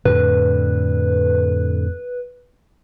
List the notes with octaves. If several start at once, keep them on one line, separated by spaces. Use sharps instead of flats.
F2 A2 D3 B4